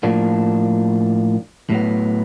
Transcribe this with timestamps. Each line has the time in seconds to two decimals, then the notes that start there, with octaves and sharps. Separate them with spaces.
0.03 A2 F3 A#3 D4
1.70 A2 F#3 B3